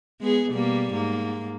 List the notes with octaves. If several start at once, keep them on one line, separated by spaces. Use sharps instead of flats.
G#3 B3 G#4
B2 G3 A#3
G#2 A#3